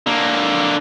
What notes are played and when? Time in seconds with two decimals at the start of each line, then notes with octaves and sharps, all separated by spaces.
0.07 D3 A#3